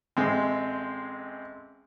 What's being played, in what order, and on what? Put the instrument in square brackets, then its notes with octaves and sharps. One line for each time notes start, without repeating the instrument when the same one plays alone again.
[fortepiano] A1 G#3 C4